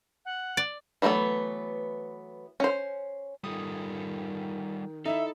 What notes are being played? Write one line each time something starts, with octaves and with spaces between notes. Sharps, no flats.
F#5
D5
E3 F#3 G3 A3 B3
C#4 C5
D#3 G3 F4 A4 D#6
D#4 E4 A4 E5